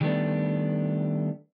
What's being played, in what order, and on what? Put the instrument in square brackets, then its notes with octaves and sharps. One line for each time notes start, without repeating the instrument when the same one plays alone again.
[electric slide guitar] D#3 F#3 G3 A3 B3 D4